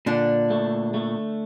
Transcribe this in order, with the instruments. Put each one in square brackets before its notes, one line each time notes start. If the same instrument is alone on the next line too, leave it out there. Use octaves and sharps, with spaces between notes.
[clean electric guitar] A#2 [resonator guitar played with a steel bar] D3 D4
[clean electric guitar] A3
A3